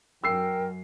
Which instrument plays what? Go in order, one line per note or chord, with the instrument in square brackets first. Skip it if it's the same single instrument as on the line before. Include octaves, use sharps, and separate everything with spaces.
[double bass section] F#2 [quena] A#4 [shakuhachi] G5 [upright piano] E6 C7